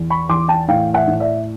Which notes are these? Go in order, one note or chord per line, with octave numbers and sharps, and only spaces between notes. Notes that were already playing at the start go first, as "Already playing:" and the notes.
Already playing: E2
B5 C#6
E2 C6 D6
G5 A5
A2 F5 G5
E5 F#5
A2
D5 E5